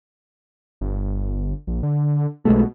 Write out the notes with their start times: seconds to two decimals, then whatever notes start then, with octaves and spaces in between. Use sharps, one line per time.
0.81 G1
1.67 A#1
1.83 D3
2.45 B1 B2 G#3 A3